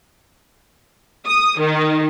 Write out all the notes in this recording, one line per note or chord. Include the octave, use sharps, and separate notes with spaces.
D#6
D#3